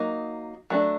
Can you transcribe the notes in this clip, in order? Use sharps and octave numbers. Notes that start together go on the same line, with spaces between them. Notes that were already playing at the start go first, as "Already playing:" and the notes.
Already playing: F#3 A#3 D#4
F#3 A3 D4